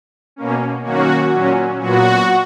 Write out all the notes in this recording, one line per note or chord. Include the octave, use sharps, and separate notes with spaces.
B2 A#3 C#4
D#3 F#3 A#3 C#4 F#4
A#2 F#3 C#4
A#2 F#3 B3 F#4